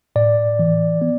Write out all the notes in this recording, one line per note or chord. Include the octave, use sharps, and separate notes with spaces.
A2 D5
E3
B3